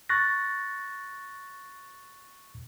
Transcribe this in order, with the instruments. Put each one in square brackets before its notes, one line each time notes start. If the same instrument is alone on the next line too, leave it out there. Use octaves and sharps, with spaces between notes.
[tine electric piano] C#6 F#6 A6 A#6